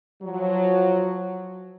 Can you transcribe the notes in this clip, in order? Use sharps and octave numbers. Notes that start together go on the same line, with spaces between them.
F3 F#3